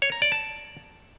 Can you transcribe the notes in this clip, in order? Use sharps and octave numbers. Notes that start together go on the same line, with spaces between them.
C#5
A#5
D5
A5